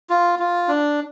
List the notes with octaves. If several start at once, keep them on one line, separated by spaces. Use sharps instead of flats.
F4
F4
D4